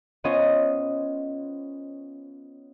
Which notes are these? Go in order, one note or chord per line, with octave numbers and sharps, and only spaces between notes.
B3 C#4 F4 C5 D#5